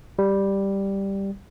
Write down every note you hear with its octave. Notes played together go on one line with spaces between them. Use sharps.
G3